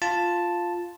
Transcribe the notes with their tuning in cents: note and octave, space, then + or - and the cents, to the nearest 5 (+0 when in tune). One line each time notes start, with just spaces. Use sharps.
F4 +0 A5 +0